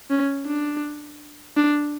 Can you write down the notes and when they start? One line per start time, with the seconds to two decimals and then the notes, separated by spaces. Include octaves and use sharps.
0.11 C#4
0.46 D4
1.57 D4